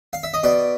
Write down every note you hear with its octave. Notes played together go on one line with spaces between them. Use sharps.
F5
E5
D#5
B2 D5